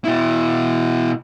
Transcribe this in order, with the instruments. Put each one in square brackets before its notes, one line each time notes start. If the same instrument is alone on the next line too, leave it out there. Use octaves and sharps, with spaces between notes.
[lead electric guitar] B2 E4